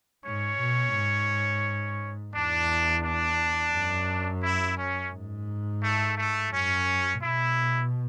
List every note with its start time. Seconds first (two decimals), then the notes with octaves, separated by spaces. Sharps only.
0.24 G#2 C#4 C#5
0.59 B2
0.94 G#2
2.33 E2 D4
3.03 D4
3.73 F#2
4.43 E4
4.78 C#4
5.12 G#2
5.82 A3
6.17 A3
6.52 F#2 C#4
7.21 B2 E4